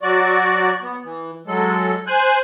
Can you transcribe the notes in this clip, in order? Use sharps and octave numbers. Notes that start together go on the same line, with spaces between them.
F#3 F#4 D5
B3
E3
F#3 G#3 A4
C5 G#5 F#6